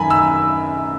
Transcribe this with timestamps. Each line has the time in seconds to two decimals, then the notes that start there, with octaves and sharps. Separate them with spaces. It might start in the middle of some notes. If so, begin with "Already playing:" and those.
Already playing: F#2 D#3 G#5 A#5 B5
0.10 E6